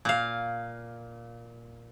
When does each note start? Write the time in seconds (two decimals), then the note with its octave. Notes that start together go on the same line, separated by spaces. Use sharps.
0.05 A#2 F5